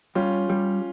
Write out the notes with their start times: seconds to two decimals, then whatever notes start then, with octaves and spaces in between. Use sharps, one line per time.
0.15 G3 C#4 F4
0.50 G3